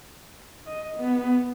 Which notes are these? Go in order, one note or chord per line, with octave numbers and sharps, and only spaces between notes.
D#5
B3